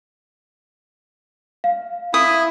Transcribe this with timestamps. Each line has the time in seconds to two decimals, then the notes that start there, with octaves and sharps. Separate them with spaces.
1.64 F5
2.14 E4 D#6